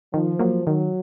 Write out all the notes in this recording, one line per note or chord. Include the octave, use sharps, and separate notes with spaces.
D#3 F3
F#3 A#3
D#3 F#3